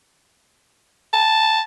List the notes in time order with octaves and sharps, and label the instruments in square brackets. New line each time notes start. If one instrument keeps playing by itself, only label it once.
[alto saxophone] A5